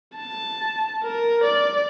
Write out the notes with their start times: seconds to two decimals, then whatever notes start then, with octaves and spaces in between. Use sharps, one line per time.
0.16 A5
1.03 A#4
1.44 D5